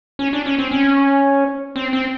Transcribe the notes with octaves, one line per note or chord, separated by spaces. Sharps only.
C#4
D4
C#4
C4
C#4
C4
C4